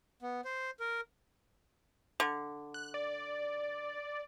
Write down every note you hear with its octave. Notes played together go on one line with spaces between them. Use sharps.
B3
C5
A#4
D3
F#6
D5